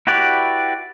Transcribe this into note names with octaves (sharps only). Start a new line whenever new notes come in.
E4 F#4 G4 B4 D5